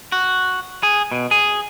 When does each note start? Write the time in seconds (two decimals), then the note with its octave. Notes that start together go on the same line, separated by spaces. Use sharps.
0.12 F#4
0.83 G#4
1.12 B2
1.31 G#4